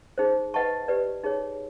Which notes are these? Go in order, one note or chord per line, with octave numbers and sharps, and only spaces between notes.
D#4 G#4 C5
B4 D#5 F#5 A5 C#6
G4 B4 D5
D#4 G#4 C#5